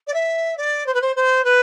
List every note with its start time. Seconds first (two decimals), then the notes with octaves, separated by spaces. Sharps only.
0.07 D5
0.14 E5
0.57 D5
0.86 C5
0.94 B4
1.01 C5
1.16 C5
1.44 B4